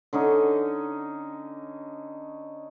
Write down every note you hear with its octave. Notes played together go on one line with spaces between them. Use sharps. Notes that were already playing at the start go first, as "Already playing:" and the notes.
D3 C#4 D#4